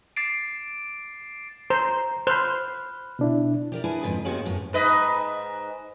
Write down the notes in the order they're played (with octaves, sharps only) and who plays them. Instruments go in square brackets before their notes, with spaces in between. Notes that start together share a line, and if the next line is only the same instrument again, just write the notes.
[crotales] D6 A6 C7 D7
[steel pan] C5 [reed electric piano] A#5
[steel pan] C5 [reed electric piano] B5 F6 F#6
[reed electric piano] B2 D4 E4
[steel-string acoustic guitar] G4 A#4 D5
D4 E4 G#4 A#4 B4 G#5
F2 G#2 D3 D#4 B4 G#5
G#3 A#3 B3 C#4 F#4 G4
F#2 A2
[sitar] G#2 B4 D#5